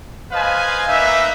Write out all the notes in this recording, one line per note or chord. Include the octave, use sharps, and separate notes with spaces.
B4 C5 D#5 F5 G#5
A#3 D#4 B4 E5